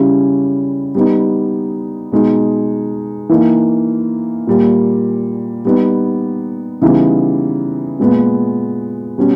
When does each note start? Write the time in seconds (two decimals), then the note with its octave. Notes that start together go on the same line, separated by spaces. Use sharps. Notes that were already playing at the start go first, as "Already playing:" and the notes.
Already playing: C#3 G3 C#4 E4
0.95 G3 B3 D#4
2.12 B2 G#3 D#4
3.29 E3 A#3 D#4
4.47 A#2 G3 A#3
5.65 G3 B3 D#4
6.82 C#3 E3 G3 B3 D#4
7.99 A#2 G#3 B3
9.18 B2 G3 C#4